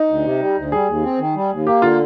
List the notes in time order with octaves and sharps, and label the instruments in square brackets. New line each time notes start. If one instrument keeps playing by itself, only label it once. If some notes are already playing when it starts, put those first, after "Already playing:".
Already playing: [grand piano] D#4
[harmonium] D2
C3
G3
D2
[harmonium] G3 [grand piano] G#4
[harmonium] D#2
C4
D#3
G3
D#2
[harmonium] A#3 [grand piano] G4
[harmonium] D3 [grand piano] F4